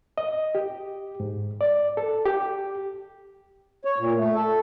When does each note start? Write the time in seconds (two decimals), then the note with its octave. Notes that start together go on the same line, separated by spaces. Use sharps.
0.18 D#5
0.55 G4
1.20 G#2
1.61 D5
1.97 A4
2.25 G4
3.85 C#5
3.99 A#2
4.17 A3
4.35 A4